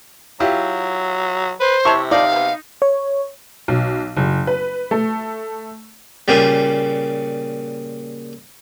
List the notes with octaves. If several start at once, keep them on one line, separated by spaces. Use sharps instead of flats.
F#3 E4 F4 G4
B4 C5
C3 E4 C#5 A5 C#6
F3 D#4 D5 F5
B2 B3
C#5
B1
F#1
B4
A3
A#2 C#3 G3